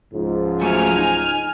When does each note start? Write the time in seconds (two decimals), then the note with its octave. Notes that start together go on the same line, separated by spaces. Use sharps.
0.14 C#2 G#2 F3
0.61 F#3 A3 G#5 F6
0.97 D#4